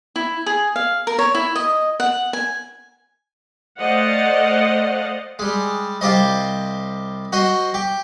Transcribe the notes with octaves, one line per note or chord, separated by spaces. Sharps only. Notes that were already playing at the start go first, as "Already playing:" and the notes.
E4
G#4
F5
A#4
C#5
E4
D#5
F#5
G#5
A3 C5 D5 D#5 F5 F#5
G3 G#3
C2 F4 G4 C5 D#5
F#4 C5 D#5
G4